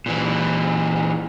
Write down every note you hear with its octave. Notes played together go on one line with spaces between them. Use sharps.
A#2 E3